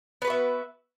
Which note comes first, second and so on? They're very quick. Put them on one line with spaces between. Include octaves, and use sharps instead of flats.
B3 B4 F#4 E5